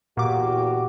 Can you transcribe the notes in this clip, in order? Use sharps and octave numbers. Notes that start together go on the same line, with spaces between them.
E2 A#2 F#4 G4 D6